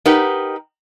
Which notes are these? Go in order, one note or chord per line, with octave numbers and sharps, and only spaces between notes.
D#4 G4 A#4 B4 F#5